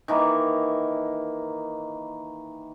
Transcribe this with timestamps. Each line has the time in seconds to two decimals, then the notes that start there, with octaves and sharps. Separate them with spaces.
0.08 D#3 E3 A#3